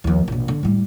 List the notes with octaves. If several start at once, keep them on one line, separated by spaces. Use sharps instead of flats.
D#2 F3
A#1 B2
D3
A2 G3